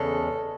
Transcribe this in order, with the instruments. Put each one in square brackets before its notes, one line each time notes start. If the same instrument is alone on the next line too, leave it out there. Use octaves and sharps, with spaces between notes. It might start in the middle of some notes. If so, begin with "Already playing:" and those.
Already playing: [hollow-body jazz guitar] E2 C#3 G#3 [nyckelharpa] A4